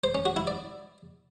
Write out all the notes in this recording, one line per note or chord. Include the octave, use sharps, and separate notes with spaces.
C5
C#4
F#4
E4
D5